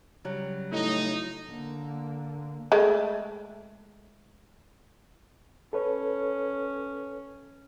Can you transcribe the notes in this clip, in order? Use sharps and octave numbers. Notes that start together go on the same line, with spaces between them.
C#3 F#3 G3
A2 D#4
D3 A#3
G#3 A3
C#4 A4 B4 C#5